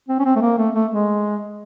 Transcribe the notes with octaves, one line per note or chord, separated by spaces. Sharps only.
C4
C#4
C4
A3
A#3
A3
A3
G#3